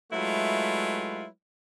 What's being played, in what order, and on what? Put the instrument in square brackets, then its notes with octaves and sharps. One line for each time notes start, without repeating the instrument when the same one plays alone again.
[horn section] F#3 G#3 A3 E4 F4 B4